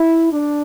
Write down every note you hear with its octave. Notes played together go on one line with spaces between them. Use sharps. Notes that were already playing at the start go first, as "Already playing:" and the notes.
Already playing: E4
D4